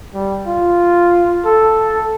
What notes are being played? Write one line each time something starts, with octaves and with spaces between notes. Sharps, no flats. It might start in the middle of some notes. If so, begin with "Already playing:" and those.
G3
F4
A4